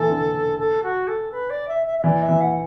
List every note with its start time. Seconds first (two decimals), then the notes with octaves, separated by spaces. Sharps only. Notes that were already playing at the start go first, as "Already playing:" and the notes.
Already playing: E3 A4
0.10 D3
0.59 A4
0.83 F#4
1.07 A4
1.31 B4
1.49 D5
1.68 E5
1.86 E5
1.98 E5
2.04 E3 D5
2.22 E5
2.29 E3
2.40 F#5